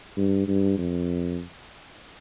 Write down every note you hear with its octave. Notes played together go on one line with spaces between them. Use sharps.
G2
G2
F2